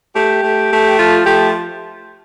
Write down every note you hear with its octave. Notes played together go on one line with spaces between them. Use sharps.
A3 G4
A3
A3
F3 F4
A3 G4